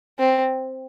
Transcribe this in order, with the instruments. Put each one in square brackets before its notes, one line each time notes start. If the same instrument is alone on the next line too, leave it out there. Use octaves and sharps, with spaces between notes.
[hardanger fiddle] C4